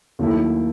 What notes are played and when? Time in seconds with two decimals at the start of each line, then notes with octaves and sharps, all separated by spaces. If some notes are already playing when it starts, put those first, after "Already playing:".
0.19 D#2 D#3 F#3 A3 E4